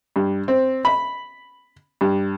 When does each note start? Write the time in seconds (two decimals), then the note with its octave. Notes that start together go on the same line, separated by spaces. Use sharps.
0.16 G2
0.48 C4
0.85 B5
2.01 G2